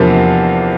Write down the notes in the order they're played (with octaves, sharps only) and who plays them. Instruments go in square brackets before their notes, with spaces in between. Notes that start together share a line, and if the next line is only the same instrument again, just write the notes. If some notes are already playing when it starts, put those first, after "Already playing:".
Already playing: [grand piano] E2 C3 F3 A#3 D4